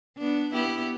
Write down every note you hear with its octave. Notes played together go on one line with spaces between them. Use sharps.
B3 D4
B3 E4 G4